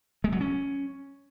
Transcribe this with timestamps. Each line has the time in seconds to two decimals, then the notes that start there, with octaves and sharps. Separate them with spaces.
0.24 G#3
0.32 F#3
0.41 C#4